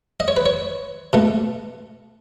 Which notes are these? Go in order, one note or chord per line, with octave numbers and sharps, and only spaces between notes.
D#5
C#5
B4
C#5
B2 A3